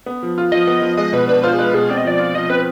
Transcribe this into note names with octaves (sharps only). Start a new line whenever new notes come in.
B3
F3
F4
F3 D#5
B3
F3
G#3 D#5
B2 B4
D4 B4
F4 C5
G#4
G#3 B4
B2 G#4
C4 D5
D#5
F3 D5
F4
F3 D#5
C4 B4